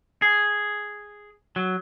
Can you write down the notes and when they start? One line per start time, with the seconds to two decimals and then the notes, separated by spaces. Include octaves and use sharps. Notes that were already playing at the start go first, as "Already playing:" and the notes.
0.22 G#4
1.56 F#3